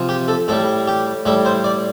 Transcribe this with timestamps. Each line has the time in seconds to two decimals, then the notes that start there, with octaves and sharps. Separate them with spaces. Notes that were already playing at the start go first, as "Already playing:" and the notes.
Already playing: C3 F3
0.09 G4
0.28 A4
0.48 A2 G3 A4
0.87 G4
1.25 A2 G3 A4
1.45 C5
1.64 D5